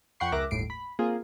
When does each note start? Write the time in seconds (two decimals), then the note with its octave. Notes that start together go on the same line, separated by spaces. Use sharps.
0.20 F2 F#5 G5 B5 C#6 C7
0.32 C#2 A#4 E5 D6 F#6 A#6
0.51 G1 D#2 A2 C7 D7
0.70 B5
0.99 A#3 C4 F4 G#4